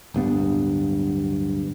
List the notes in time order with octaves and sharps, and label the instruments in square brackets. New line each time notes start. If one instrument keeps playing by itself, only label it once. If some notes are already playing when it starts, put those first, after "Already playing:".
[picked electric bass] D1 G2 B3